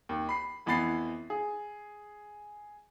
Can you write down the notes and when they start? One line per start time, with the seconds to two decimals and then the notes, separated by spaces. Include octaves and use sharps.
0.09 D#2
0.29 B5 C7
0.66 F2 E3 B3 B5 A6 C7
1.30 G#4